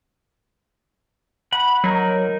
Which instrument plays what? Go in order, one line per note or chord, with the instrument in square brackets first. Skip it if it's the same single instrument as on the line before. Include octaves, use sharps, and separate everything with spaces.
[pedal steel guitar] F#5 B5
[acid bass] F#3 [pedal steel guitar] D#4 A#4